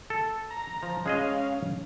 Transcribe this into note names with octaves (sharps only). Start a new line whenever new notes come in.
A4
A#5
F3
G#3 C#4 G#4 D#5 F5